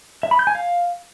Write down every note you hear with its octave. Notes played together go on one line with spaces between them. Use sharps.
E5
B5
G6
G#5
F5